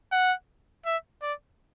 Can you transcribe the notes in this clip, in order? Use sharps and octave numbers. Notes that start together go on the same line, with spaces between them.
F#5
E5
D5